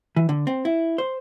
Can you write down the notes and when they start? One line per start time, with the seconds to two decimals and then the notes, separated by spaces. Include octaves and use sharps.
0.16 E3
0.29 D3
0.47 C4
0.65 E4
0.98 C5